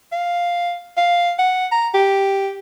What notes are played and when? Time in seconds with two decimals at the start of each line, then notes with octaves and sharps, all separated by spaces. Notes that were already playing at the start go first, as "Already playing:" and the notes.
0.12 F5
0.97 F5
1.39 F#5
1.72 A#5
1.94 G4